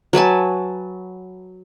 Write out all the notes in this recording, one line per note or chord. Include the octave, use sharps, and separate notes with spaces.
F#3 B4 G#5 A5